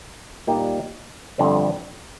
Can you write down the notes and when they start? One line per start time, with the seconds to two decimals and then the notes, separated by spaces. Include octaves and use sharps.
0.47 A#2 G3 A#3 D#4 G4
1.38 G1 F2 D3 G3 C4